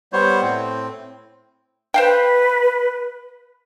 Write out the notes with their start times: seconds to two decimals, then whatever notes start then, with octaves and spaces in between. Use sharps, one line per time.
0.13 G3 B3 C5 C#5
0.42 A2 C4
1.94 B4 C5 F5 G5